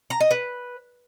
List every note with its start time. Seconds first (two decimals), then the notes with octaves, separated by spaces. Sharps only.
0.10 A#5
0.20 D#5
0.31 B4